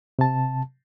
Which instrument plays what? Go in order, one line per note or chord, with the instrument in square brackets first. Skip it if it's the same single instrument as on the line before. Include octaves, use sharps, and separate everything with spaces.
[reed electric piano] C3 A5